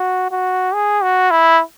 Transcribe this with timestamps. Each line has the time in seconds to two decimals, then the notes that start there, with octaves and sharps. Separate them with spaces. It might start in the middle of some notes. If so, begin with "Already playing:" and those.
Already playing: F#4
0.31 F#4
0.74 G#4
1.03 F#4
1.31 E4